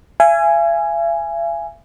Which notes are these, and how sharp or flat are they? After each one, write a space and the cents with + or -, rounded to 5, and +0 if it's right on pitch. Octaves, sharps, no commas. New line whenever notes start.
E5 +45 G#5 +0